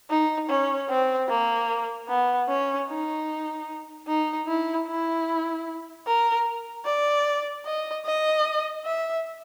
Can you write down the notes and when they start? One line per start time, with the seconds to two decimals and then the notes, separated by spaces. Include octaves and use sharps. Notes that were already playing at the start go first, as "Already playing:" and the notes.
0.10 D#4
0.49 C#4
0.89 C4
1.29 A#3
2.09 B3
2.48 C#4
2.89 D#4
4.07 D#4
4.47 E4
4.87 E4
6.07 A#4
6.86 D5
7.66 D#5
8.05 D#5
8.85 E5